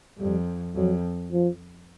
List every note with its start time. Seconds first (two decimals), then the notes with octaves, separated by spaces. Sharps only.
0.19 F2 G3
0.76 F2 F#3
1.32 F3